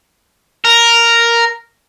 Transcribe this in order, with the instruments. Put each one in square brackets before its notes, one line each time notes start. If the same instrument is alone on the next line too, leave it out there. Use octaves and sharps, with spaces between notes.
[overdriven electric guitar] A#4